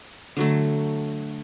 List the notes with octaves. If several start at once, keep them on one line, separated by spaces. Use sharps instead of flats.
D3 F#3 A3